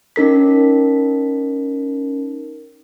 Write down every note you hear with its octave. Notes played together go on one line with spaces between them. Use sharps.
C#4 D#4 A#4 B6